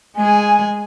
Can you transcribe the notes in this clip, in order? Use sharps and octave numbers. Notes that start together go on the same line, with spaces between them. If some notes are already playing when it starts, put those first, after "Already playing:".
G#3 G#4 G#5